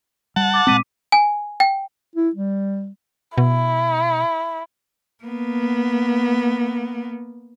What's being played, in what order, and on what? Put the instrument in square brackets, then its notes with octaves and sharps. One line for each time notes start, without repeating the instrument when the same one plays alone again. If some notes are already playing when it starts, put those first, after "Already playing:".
[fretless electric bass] G3 [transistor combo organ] F#5 A5
[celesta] D6 A6
[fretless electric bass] A#2 G#3 C4 [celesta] D6 B6 D#7
[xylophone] G#5
G5
[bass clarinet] E4
G3
[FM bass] B2 [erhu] E4
[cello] A#3 B3